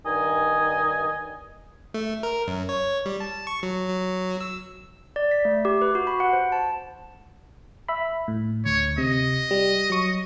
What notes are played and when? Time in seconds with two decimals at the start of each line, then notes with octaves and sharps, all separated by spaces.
0.05 G2 D#3 D#5 G#5
1.94 A3
2.23 A#4
2.47 F#2
2.69 C#5
3.06 G3
3.20 A5
3.47 C#6
3.63 F#3
3.89 F#3
4.41 E6
5.16 D5
5.31 B6
5.45 A3
5.65 G4
5.81 B4
5.95 F#4
6.07 B5
6.20 F#5
6.33 C5
6.52 A5
7.88 E5 B5
8.28 A2
8.65 D2 C#5
8.98 C3 D#5
9.51 G3
9.90 F#3 C#6